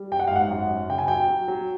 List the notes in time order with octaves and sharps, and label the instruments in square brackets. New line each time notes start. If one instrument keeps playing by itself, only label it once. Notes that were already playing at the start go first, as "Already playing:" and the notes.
Already playing: [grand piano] G3
F#2 G5
F#5
F5
G#1 F#5
F#2
F#2
C#3 G5
G#5
F#3 G5
F#3
F#3